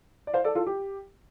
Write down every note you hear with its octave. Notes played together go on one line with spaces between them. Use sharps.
D5
C5 F5
A4 D5
F4 A4
G4